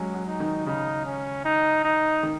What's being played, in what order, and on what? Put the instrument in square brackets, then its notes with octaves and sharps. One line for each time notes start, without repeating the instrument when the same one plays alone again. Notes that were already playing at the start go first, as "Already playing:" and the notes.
Already playing: [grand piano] F#3 G#3 [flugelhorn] C#4
[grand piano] F#3
[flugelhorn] D#4
[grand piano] D#3
[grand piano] C#3 [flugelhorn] D#4
[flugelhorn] C#4
D#4
D#4
[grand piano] D#3